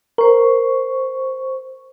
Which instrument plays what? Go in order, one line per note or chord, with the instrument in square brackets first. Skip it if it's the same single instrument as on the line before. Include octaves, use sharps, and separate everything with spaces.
[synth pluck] A#4 [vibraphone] C5 C#6